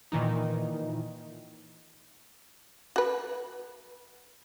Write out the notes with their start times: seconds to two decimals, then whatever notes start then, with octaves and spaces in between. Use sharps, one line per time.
0.12 A#2 D#3 E3 D#4
2.96 F#4 B4